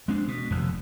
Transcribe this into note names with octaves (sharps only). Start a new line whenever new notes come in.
G#3 C4 D4
B2
F1 D#2